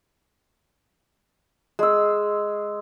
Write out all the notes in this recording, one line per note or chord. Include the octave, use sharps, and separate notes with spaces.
G#3 E6